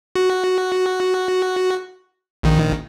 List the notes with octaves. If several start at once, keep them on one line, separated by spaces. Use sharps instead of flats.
F#4
A#1 D#3